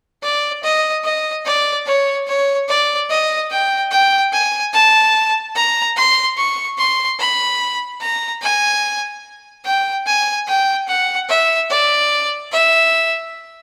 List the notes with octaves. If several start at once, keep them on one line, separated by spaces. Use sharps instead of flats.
D5
D#5
D#5
D5
C#5
C#5
D5
D#5
G5
G5
G#5
A5
A#5
C6
C#6
C6
B5
A#5
G#5
G5
G#5
G5
F#5
E5
D5
E5